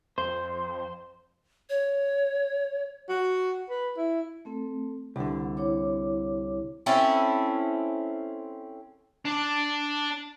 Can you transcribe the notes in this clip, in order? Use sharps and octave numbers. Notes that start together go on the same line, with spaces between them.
F2 C5
C#5
F#4
B4
E4
A3 C4 A4
C2 D3 F#5
E4 C#5 D6
C4 C#4 E4 A4
D4